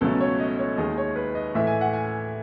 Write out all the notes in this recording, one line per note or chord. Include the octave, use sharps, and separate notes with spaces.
C#2 B2 F#3 A3 A4
C#5
D#5
C#5
D#2 D#3 G#3 D#5
C#5
B4
D#5
A2 E3 A3 E5
G#5
F#5
G#5